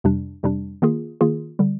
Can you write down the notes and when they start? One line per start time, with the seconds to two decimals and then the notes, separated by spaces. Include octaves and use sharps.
0.04 F2 C3 G3 D4
0.43 F2 C3 G3 D4
0.82 D#3 A#3 F4 G#4
1.21 D#3 A#3 F4 G#4
1.59 D3 G3